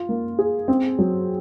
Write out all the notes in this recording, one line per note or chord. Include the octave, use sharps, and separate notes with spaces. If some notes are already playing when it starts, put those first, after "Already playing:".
Already playing: F4
A#3
G#4
C4
F#3